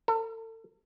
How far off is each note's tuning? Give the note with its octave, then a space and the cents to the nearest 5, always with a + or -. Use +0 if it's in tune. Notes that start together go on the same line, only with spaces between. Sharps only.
A4 +40